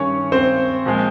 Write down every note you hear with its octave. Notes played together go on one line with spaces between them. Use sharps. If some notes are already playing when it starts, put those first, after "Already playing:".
Already playing: G2 D#3 G3 C#4 C#5
C4 C5
A#2 F3 G#3